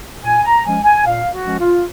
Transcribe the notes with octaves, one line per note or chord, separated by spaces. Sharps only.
A#2 G#5
A#5
F3 G#3 C#4 G#5
G#5
A#2 F5
F#4
F3 G#3 C#4
F4